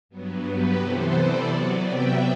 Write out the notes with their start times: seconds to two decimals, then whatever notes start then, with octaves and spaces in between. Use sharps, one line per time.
0.09 G2 F#3 B3
0.43 G4 B4
0.76 C3 E3 B3 A4 C5
1.11 B4 D5
1.44 C3 F#3 B3 D5 F#5
1.77 E5 G5